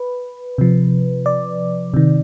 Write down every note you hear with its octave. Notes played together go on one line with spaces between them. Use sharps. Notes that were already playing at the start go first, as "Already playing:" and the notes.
Already playing: B4
C3 F3
D5
C3 D#3